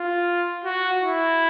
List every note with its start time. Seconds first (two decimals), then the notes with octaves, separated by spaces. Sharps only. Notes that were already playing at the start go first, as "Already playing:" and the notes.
Already playing: F4
0.64 F#4
1.01 E4